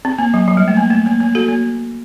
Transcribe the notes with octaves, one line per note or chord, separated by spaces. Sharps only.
C4
A#3
F#3
F#3
G3
A3
A#3
A3
A#3
A#3
F#4 A4
A#3